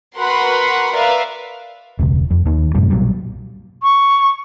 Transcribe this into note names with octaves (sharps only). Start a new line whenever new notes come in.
F#4 A#4 B4 F#5 B5 C6
A#4 B4 D5 E5 F5
E1 C#2
F2
D#2 D#3
F#2 A2 C3 G3
B1 A#2 F#3 G3
C#6